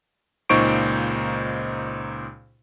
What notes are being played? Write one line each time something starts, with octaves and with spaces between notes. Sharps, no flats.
C#2 A#2 D#4 C5 C#6 D7